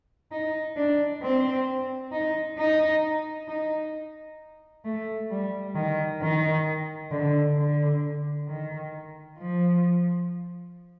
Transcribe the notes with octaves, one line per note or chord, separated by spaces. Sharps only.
D#4
D4
C4
D#4
D#4
D#4
A3
G3
D#3
D#3
D3
D3
D#3
F3